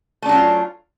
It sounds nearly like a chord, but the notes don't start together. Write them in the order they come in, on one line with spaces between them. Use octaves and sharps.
A3 D4 F#3 C#4 F4